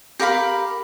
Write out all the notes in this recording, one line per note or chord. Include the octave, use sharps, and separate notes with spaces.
G4 A#4 F5 B5